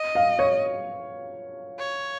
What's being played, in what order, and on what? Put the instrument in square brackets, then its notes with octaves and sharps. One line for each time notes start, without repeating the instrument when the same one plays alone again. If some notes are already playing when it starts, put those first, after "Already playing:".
Already playing: [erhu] D#5
[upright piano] F5
C#5
[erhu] C#5